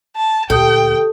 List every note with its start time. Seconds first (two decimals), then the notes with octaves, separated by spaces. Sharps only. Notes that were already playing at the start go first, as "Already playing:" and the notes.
0.16 A5
0.50 D2 A#2 G4 A4 G5 D#6 G6